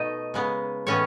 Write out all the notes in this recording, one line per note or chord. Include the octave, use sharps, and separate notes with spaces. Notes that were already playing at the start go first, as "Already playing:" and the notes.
Already playing: B2 A3 D#4 D#5
C#3 G#3 B3
A2 E3 G#3 B3 C#4 C#5